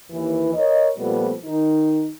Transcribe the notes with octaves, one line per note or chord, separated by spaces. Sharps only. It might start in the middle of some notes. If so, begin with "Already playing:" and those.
D#2 E3
A#4 C#5 D#5
A#2 F3 G3 A3 B3
D#3 D#4